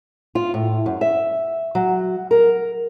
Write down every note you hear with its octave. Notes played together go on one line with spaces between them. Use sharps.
F4
A2
F#2
E5
F#3
A#4